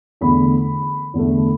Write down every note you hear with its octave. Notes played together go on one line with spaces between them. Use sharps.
E2 D3 A3 B5
E2 D3 A3